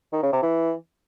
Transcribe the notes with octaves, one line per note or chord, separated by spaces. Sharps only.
D#3
C#3
C3
E3